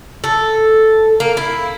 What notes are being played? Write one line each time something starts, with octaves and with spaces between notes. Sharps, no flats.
A4
A#3
E4